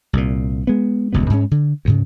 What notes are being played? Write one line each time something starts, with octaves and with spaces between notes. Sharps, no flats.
C2 A#2
G#3 B3
D#1 C#2 G2 B3
G#2 G#3 C#4
D3
D2 G#2 C#3